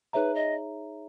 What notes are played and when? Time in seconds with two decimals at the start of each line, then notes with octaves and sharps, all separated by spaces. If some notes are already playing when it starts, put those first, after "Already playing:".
0.13 D#4 G#4 B4 C#5 E5 A#5
0.34 D#5